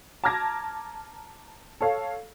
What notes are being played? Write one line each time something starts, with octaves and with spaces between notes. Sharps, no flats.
A5 A#5 D6 F6 G#6 A#6
A4 C#5 F5